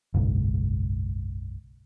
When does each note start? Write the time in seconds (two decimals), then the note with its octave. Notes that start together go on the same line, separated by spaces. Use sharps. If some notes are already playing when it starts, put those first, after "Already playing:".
0.14 F#1 B1 G#2